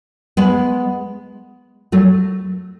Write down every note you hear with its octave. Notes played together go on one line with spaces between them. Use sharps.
G#3 B3
F#3 A3